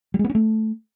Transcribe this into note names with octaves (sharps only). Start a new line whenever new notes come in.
G3
G#3
B3
C#4
A3